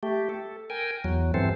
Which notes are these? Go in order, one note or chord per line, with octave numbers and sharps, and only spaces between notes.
A3 G4
A4
A#4 G5 G#5
E2 F#3
G2 E3 C4 A4 C5